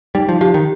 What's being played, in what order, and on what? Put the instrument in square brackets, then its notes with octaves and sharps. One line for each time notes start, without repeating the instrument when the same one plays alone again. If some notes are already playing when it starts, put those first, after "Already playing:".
[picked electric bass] G3 [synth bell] D#4
[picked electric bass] F3
[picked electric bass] F3 [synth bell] G4
[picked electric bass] D#3